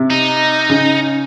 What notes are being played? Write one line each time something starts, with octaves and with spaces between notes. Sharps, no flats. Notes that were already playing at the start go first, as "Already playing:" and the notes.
Already playing: C3
D#4
C#3